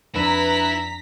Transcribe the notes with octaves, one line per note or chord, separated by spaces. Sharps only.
F2 D4 E4 B4 A#5 B6